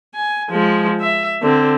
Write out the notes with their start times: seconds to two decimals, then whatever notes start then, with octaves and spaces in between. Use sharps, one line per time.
0.15 G#5
0.51 F3 G#3
1.01 E5
1.42 D3 C4